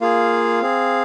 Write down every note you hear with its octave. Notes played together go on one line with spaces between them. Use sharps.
A#3 F4 G#4 F5
C4 G#4